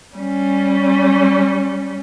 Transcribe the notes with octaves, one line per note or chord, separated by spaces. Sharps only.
G3 C#4